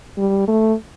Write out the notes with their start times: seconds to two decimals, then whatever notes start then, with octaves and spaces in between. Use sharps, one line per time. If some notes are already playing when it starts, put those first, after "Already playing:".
0.18 G3
0.48 A3